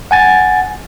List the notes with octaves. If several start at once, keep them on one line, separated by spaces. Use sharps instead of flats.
F#5 G#5 A6